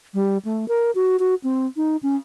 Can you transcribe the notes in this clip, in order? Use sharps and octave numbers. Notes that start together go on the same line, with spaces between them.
G3
A3
A#4
F#4
F#4
C4
D#4
C#4